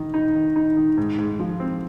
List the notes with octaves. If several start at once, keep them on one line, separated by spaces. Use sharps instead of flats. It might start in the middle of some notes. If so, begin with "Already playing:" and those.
Already playing: D#3 D#4
D#4
D#3
D#4
D#3
G#2
G#2
F3
C4